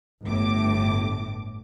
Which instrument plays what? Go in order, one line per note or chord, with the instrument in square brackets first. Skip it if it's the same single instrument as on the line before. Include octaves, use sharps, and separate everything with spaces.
[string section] G1 A2 D6